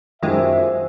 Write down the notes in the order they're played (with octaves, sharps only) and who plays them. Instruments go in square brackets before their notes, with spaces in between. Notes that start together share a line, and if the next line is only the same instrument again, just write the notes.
[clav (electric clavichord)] F#2 F4 G4 [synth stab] D#3 G#3 [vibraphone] C5 G#5 [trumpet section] E5